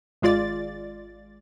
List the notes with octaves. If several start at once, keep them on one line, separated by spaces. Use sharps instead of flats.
G#1 G#3 F4 D5 A6